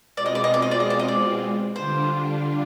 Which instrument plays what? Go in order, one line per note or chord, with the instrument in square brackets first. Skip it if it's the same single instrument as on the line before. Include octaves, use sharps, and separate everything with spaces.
[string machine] B2 G#3 C4 F4 [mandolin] D5
[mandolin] D#5
D5
D#5
D5
D#5
D5
D#5
D5
D#5
D5
[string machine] D3 G3 D4 F4 [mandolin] C5